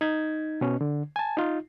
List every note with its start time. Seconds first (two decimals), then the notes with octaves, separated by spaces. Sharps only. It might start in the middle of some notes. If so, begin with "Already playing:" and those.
0.01 D#4 G#6
0.61 B2 C#4
0.81 D3
1.16 G#5 A5
1.37 D#4 F4